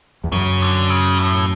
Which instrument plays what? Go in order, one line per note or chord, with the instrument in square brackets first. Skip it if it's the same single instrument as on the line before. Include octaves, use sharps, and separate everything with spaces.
[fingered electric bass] E2
[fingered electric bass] F#2 [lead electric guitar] C#3
[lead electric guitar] D3
C#3
A2